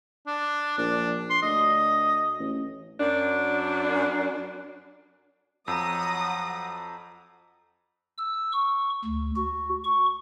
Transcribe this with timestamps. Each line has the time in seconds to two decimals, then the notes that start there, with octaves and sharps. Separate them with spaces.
0.27 D4
0.78 A#1 D4
1.30 C6
1.42 D2 D#5
2.39 A1
3.00 F#2 D4
5.68 F2 F#3 F#5 A#5 D#6 E6 A#6
8.18 E6
8.53 C#6
9.05 D2
9.36 F#4
9.85 C#6